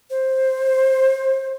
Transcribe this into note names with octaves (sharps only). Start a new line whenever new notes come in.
C5